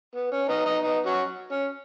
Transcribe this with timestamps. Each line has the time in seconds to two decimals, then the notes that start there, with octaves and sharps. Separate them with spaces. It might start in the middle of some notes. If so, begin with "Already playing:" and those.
0.15 B3
0.32 C#4
0.49 B3 D#4
0.66 B3 D#4
0.83 B3 D#4
1.05 C#4 F#4
1.51 C#4